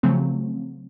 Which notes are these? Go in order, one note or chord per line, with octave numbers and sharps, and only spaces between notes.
C#3 F3 F#3 A3 C4